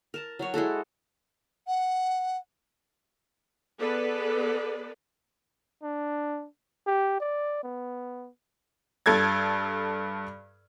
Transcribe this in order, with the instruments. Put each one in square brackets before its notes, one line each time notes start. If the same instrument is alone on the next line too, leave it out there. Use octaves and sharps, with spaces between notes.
[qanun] A#4 A5 A#5
F#3 F#4 C#5
G#3 E4 F#4 A4
[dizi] F#5
[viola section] B3 G#4 A4 B4 D5
[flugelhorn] D4
G4
D5
B3
[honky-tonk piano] G2 A4 G#6 A6